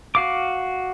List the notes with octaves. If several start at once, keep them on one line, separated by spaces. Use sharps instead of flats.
F#4 F5 D6